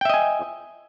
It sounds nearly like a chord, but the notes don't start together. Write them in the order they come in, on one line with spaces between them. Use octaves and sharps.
G5 E5 D#5 G#5